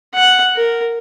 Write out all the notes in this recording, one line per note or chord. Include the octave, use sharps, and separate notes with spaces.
F#5
A#4